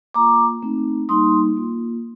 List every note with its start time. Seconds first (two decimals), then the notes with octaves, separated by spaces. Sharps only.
0.14 A#3 F4 A#5 D6
0.62 A3 C4 D#4
1.09 G3 A#3 D#4 C6 D#6
1.57 A#3 F4